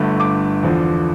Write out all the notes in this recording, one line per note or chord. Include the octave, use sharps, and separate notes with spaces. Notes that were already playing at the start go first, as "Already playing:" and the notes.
Already playing: G1 G2 D3 A3
D6
E2 D3 F3